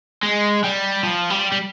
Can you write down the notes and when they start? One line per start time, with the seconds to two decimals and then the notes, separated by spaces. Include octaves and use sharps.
0.23 G#3
0.64 G3
1.03 F3
1.30 G3
1.52 G3